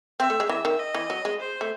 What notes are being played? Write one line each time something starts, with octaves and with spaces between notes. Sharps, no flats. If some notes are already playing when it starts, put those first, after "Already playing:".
C4 E5
A3
G#3
E3 E5
D#3
D#5
E3
F#3
G#3
C5
A3